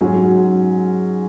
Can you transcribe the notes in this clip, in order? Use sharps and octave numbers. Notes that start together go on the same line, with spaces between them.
G#2 F#3 C#4